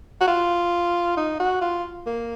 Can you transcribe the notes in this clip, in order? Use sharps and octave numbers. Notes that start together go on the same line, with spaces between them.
F#4
F4
D#4
F#4
F4
A#3